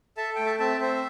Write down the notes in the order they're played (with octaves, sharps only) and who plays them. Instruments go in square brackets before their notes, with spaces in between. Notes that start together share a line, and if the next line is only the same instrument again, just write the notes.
[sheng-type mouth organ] A4 E5 A5
A3 G5
E5 A5
C4 E5 A5
C4 C5 E5